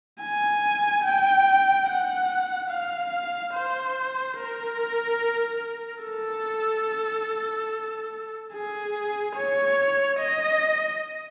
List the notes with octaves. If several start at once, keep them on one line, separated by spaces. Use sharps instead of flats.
G#5
G5
F#5
F5
C5
A#4
A4
G#4
C#5
D#5